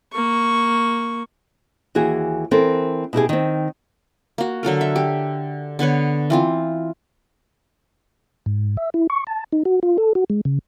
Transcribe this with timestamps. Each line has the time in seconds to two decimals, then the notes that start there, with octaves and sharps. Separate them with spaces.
0.13 A#3 C#6
1.95 D#2 E3 F#4 G#4
2.51 E3 C4 A4 A#4
3.13 B2 E4 G4 G#4
3.29 D#3 C4
4.38 A#3 F#4
4.63 D3 F#3 A4 A#4
4.81 E5
4.96 G4
5.79 D3 B3 B4 C#5
6.30 E3 C4 F4
8.46 G#2
8.77 E5
8.94 E4
9.10 C#6
9.27 A5
9.52 D#4
9.65 F#4
9.83 F4
9.98 A4
10.15 F#4
10.30 G#3
10.45 C#3